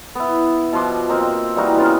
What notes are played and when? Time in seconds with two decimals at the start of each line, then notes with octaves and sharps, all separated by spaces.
0.15 B3 E4
0.73 B2 F3 C6 D6
1.09 A#3 C4 D#4
1.56 E3 G3 D#4 F#4
1.78 C#3 B3 F4